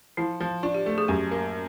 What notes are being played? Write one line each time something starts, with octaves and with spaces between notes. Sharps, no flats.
F3 E4
F3
D4 F4
G4
A3
G#4
F#2 G4
A#3